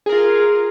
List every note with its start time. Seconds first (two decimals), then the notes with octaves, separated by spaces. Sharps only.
0.06 G#4
0.09 A#4
0.12 F4